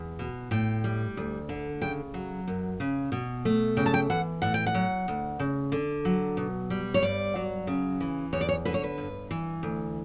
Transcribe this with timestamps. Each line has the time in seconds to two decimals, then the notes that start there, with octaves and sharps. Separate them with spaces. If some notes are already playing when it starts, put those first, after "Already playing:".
Already playing: E2
0.19 B2
0.51 A2 G5
0.84 G3
1.17 D2
1.49 D3
1.82 C#3 G5
2.14 F#3
2.48 F#2
2.80 C#3
3.12 B2
3.45 A3
3.77 C#3 G5
3.86 A5
3.94 G5
4.10 E3 F#5
4.42 A2 F#5
4.54 G5
4.66 F#5
4.75 F#3
5.08 D2
5.39 C#3
5.72 D3
6.05 F#3
6.37 B2
6.70 G3
6.94 C#5
7.02 G2 D5
7.36 F#3
7.67 C#3
8.01 E3
8.33 E2 C#5
8.41 D5
8.49 C#5
8.65 D3 B4
8.74 C#5
8.84 B4
8.98 G2
9.31 E3
9.63 D2